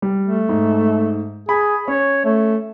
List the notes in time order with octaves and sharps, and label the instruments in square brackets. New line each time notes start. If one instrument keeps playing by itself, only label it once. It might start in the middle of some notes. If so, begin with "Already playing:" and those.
[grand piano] G3
[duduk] A3
[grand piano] G#2
[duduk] G#4 [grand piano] B5
[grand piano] C#4 [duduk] C#5
[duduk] A3